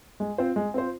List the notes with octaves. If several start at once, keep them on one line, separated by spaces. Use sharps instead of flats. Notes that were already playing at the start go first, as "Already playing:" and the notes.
G#3
C4 F4 C5
G#3
C4 F4 C5